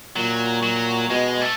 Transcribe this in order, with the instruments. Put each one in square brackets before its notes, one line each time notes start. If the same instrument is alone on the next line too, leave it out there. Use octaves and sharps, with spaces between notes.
[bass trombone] A#2 [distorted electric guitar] F#3
[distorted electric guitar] F#3
[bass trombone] B2 [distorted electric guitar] G#3
[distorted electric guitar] A3